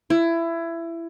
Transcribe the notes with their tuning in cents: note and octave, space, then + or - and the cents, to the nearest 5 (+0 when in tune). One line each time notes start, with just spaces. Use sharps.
E4 +20